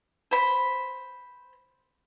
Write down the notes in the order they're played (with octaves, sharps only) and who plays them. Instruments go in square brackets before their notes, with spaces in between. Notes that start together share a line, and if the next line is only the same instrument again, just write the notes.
[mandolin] C5 B5